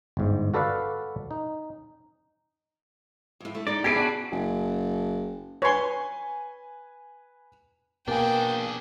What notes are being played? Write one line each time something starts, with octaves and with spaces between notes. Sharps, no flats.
G1 G#2
F#4 A4 B4 D5 F5 F#5
D#4
F2 A2
D3 A3
G#3 D#4 D5
B3 E4 G4 G#4 D5 G#6 C7 D7
D4 F#4
F#1
B4 C#5 G#5 C6
B2 A#3 D4 G#4 G5 G#5